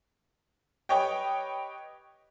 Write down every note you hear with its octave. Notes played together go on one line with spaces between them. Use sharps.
G4 B4 C#5 D#5 G5